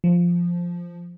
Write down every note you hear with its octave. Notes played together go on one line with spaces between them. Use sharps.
F3